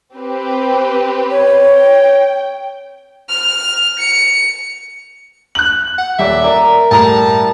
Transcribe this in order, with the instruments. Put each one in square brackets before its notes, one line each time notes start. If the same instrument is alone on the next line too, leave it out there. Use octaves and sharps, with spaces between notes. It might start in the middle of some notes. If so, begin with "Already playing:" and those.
[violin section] C4 G4 B4
[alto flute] C#5
[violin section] G5
[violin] F6
C#7
[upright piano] F#6 F#7
[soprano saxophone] F#5
[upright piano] D#1 D5 [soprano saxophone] E5
[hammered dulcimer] A#4 [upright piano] D5
[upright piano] A2 A#5 [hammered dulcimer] G3 [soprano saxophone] A5